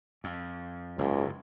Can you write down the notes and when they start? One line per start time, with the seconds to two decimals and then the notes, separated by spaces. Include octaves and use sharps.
0.24 F2
0.98 F#1 C#2 G#2